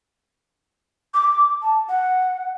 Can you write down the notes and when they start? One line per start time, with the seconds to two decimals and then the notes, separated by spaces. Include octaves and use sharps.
1.14 D6
1.62 A5
1.89 F#5